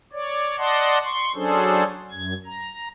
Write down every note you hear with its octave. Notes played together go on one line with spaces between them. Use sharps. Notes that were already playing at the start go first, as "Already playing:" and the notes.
C#5 D5
D5 D#5 F#5 A5 C6
C6 C#6
F#3 C#4 D4 G#4 A4 C5
F#2 G#6
A#5